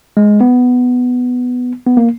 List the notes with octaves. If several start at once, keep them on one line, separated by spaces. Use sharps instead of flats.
G#3
B3
B3
A#3